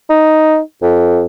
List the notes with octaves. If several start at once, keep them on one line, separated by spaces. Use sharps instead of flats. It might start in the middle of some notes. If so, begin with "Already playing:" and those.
D#4
F2